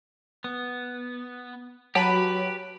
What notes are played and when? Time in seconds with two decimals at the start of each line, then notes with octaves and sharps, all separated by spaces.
0.44 B3
1.95 F#3 G4 B4 A5 B5